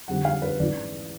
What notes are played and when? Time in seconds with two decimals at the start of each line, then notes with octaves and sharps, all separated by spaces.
0.08 F2 D3 G3 C4 F#5
0.25 F5
0.42 B4
0.59 A1 G#2 E3 D5